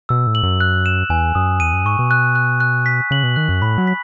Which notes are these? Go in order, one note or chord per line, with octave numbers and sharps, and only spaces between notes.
B2 E6
A2
F#7
F#2
F#6
E7
E2 G#5
F#2 D#6
E2 D#7
F#2
G#2 C#6
B2
F#6
F#6
F#6
B6
C#3 F#7
B2
D#3 F#6
F#2
A2 B5
F#3
B6